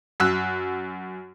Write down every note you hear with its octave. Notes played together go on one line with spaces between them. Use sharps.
F#2 E6 F#6